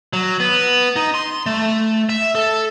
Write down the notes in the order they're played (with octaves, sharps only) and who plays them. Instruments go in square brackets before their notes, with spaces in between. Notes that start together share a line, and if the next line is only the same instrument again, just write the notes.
[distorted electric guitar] F#3
B3
D#4
C6
A3
E5
A4